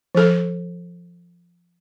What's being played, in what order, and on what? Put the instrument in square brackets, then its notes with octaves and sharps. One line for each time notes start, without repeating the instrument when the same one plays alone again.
[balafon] F3 A4